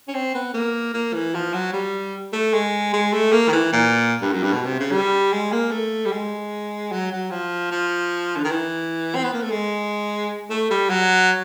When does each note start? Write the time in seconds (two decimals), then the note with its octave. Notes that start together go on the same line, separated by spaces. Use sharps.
0.08 C#4
0.14 C4
0.35 B3
0.54 A#3
0.94 A#3
1.14 E3
1.34 F3
1.54 F#3
1.73 G3
2.33 A3
2.54 G#3
2.94 G#3
3.13 A3
3.33 A#3
3.49 D#3
3.53 E3
3.73 A#2
4.22 G2
4.32 F#2
4.43 G2
4.53 B2
4.65 C3
4.80 C#3
4.92 G3
5.32 G#3
5.53 A#3
5.72 A3
6.05 G3
6.12 G#3
6.92 F#3
7.12 F#3
7.31 F3
7.71 F3
8.37 D3
8.44 D#3
8.51 E3
9.15 C4
9.24 B3
9.33 A#3
9.42 A3
9.51 G#3
10.50 A3
10.71 G3
10.90 F#3